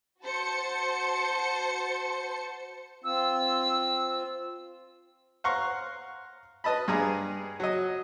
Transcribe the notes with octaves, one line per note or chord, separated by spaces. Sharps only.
F#4 C5 A5 C#7
C4 F4 E6
F5 F#5 A#5 C6 C#6
B4 D#5 A5 B5
G2 G#4 A#5
F#3 D#5